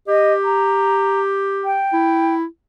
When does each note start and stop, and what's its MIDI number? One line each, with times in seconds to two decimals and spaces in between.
0.08 1.81 67
0.08 0.33 75
0.44 1.21 82
1.65 2.35 79
1.93 2.45 64